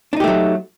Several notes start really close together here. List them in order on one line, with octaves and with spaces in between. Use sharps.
D4 D#4 G4 A3 F#3